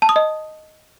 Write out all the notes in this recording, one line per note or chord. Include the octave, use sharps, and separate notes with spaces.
A5
D#6
D#5